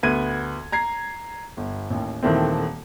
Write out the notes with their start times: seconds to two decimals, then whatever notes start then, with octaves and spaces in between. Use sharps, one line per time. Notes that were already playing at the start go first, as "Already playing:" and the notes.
0.03 D2 B3 G#6 D#7
0.72 A#5 G#6 C7
1.57 G1
1.90 A1 D#2
2.23 D#1 D#3 E3 A3 C4